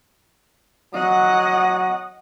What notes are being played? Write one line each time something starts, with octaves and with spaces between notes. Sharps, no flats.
F#3 D#5 F#5